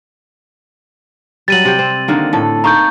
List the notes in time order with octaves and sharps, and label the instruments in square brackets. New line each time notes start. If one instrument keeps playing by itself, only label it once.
[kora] F#3 G3 [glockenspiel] A6 D#7 F#7
[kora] C3 G5
C4
D3 D#3 A#3
A2 A4
[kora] A#3 D#4 [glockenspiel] A#5 C#6 G6